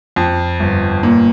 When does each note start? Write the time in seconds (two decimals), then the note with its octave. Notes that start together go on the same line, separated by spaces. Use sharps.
0.16 F2
0.60 G1
1.03 A#2